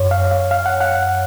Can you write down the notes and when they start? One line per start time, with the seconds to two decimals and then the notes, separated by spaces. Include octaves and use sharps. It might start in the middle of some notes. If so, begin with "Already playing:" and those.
Already playing: F#2 C#5
0.11 F5
0.31 F5
0.51 F5
0.66 F#5
0.80 F#5